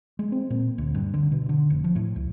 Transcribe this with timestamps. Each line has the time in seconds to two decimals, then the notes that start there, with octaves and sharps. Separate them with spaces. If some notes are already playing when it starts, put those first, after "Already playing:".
0.19 G#3
0.32 C4
0.50 A#2
0.78 D2
0.94 G2
1.14 D3
1.32 B2
1.49 D3
1.70 F1
1.84 F3
1.95 A2
2.16 C#2